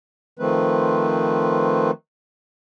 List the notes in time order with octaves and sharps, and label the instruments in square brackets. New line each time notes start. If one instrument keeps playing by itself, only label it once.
[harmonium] D#3 F3 A3 C4 B4